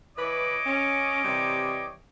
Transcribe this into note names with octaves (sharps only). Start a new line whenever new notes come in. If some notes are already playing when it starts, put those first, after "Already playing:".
E3 E4 B4 C#5 D#5 D6
C#4
C3 E3 G3